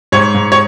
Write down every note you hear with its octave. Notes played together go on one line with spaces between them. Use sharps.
G#2 C#5
G#2
C#5